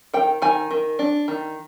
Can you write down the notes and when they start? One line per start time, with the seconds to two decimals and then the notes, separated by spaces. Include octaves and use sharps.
0.14 D#3 G5
0.42 D#3 G#5
0.71 D#3
0.99 D4
1.28 D#3